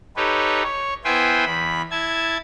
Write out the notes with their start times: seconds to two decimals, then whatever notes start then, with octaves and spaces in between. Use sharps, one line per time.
0.17 D#4 G4 A4 B4 C#5
0.64 C#5
1.05 B3 E4 B4 C5 G5 G#5
1.46 E2 B5
1.91 E4 A5 G#6